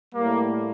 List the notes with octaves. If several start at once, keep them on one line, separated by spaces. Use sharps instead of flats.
A2 G3 A#3